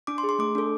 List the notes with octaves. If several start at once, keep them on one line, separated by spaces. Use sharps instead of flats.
D4 D6
C6
G#4
C6
A3 D6
D4 A4